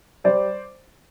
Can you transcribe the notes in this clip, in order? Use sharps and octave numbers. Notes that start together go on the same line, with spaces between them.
G3 C5 D5